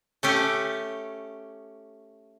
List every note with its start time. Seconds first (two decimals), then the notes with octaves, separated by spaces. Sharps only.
0.23 A3 C#4 G4